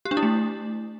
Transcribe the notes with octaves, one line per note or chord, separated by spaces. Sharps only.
G4
D4
E4
A3